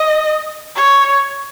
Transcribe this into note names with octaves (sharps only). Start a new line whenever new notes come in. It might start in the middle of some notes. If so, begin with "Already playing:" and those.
Already playing: D#5
C#5